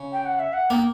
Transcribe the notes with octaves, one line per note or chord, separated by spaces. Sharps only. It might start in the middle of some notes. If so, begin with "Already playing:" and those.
Already playing: C#3
G5
F#5
E5
F#5
A#3 G5